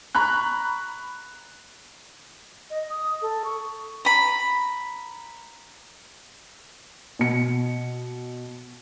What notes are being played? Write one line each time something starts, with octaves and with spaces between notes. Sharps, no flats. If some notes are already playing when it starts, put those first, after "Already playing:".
A#5 B5 C#6 F#6
D#5
D#6
A4
C#6
A#5 B5
B2 C#7